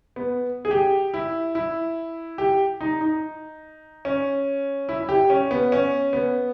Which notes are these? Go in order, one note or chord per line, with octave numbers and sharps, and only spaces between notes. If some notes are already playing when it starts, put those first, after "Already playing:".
B3
G#4
G4
E4
E4
G4
D#4
D#4
C#4
E4
E4
G4
C#4
B3
C#4
B3